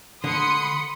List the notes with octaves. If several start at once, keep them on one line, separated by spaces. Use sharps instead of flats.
D3 B5 C6 D#6 C#7